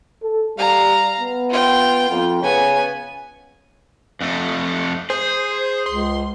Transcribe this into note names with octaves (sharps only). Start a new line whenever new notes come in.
A4
G3 F5 A#5
B3
F4 G5
F2
C#3 B3 G#5
F2 A3
G#4 C5
C#2 C6